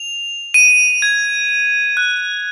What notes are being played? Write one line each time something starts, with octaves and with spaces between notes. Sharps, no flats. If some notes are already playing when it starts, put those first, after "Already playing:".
Already playing: F7
D#7
G#6
F#6